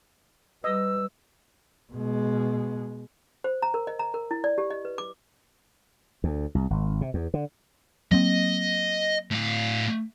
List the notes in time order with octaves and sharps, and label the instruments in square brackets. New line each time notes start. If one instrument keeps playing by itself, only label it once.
[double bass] G3 [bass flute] B4 [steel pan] D#5 [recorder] E6
[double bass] B2 G#3
[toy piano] C5
A#5
A#4
D#5
A#5
A#4
E4
D5
G4
D#5
B4
D6
[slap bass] D2
C2
G#1
C3
E2
D3
[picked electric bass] F#3 A#3 C4 [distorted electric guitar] D#5
[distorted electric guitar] A2 F5